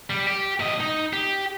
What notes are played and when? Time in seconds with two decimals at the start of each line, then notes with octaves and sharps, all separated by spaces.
0.10 G3
0.27 G4
0.60 A2 D#5
0.80 D#4
1.13 G4